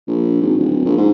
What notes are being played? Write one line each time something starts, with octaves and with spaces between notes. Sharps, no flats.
A#1
G#1
D1
A#1
G#2